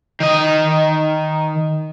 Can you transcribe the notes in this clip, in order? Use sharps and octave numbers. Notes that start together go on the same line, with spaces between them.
D#3 D#5